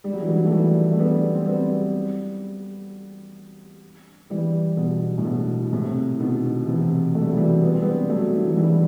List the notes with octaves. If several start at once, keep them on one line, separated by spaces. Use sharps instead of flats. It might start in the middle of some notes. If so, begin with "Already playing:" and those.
G3
F#3
E3
D#3 F#3
A3
E3 G3
A3
G3 B3
C4
G3 B3
E3 G3
B2
A2
B2
A2 C3
B2 D#3
C3 E3
A3
G3
F#3
E3 G3
B3
C4
G3 B3
F#3 A3
D#3
E3
F#3
E3 G3